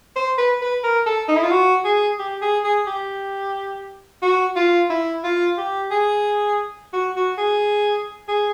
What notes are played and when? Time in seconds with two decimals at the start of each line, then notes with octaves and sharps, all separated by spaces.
0.16 C5
0.38 B4
0.62 B4
0.84 A#4
1.06 A4
1.28 D#4
1.36 E4
1.44 F4
1.51 F#4
1.85 G#4
2.19 G4
2.42 G#4
2.64 G#4
2.87 G4
4.22 F#4
4.56 F4
4.90 E4
5.24 F4
5.58 G4
5.91 G#4
6.93 F#4
7.16 F#4
7.38 G#4
8.28 G#4